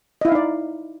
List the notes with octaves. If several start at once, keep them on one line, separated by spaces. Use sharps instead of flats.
D#4 E4 D5 D#5 F5